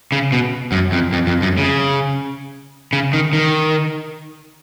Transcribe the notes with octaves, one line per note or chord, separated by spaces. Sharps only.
C#3
B2
F#2
F2
F2
F2
F#2
C#3
C#3
D#3
D#3